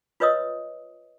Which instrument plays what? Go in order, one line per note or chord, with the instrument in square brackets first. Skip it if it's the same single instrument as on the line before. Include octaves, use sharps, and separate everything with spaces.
[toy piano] F4 B4 C#5 D#5 D#6 E6